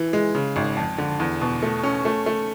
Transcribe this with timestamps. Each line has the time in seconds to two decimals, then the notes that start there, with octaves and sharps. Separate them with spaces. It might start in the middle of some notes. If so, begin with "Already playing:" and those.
Already playing: E3
0.13 G#3
0.35 C#3
0.56 G#1
0.77 F2
0.98 D3
1.20 E2
1.41 B2
1.63 A3
1.83 C#4
2.05 A3
2.26 A3